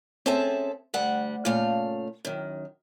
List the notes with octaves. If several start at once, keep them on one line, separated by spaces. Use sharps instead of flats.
C4 C#4 G#4 A4 E5 A5
D2 G3 F#5
A#2 C#3 A3 F5
F#2 D#3